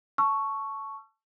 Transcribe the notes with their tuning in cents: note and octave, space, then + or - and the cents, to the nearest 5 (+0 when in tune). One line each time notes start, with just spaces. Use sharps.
A5 +0 C#6 +0 E6 +40